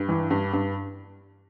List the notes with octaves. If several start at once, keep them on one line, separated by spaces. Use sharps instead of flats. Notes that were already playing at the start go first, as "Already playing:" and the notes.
Already playing: G2
E3
G2
G2